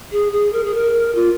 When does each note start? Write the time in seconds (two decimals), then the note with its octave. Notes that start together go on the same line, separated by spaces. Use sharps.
0.12 G#4
0.32 G#4
0.53 A#4
0.64 G#4
0.74 A#4
1.15 F4